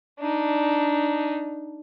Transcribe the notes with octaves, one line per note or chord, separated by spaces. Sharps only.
D4 D#4